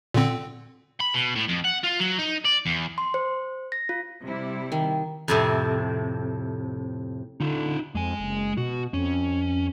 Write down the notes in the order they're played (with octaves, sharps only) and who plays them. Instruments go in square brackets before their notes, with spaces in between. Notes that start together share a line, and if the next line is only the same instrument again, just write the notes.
[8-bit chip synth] A#2 D3 C4
[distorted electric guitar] B5
B2
A2
F2
F#5
F4
F#3
D#4
D5
E2
[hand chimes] C6
C5
A#6
F4
[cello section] C3 G3 E4
[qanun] D#3
[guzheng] F2 A2 C3
[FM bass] D3 [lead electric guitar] D#4 F4
[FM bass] F2 [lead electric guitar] G#3 G#5
[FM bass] F#1
[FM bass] B2 [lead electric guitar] F#4
[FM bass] F2 [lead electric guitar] C#4